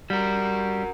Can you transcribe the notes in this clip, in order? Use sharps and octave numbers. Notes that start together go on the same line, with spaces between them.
G3 F#4 A#4